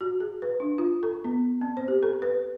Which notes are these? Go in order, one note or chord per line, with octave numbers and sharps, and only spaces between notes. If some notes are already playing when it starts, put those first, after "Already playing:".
F#4
G#4
B4
D4
F4
A4
B3
C4
C5
G4
A4
B4